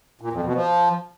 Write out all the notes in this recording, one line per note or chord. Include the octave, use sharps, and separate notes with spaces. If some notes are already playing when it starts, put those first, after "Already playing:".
A#2
F2
B2
F3